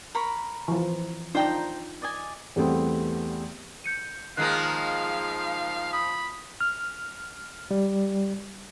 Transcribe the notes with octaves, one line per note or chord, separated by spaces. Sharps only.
A#4 B5 C#6
E3 F3
D4 D#4 F4 C5 G5 A#5
D5 D#5 G#5
E2 G3 A3 B3 C4
G6 C#7 D#7
D#3 F3 G#3 A#3 F5 F#6 C7
B5 D#6
F6
G3